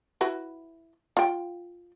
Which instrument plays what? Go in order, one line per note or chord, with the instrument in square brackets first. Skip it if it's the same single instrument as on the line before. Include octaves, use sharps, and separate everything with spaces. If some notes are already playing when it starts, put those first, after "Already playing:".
[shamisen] E4 F#4 B4
F4 G5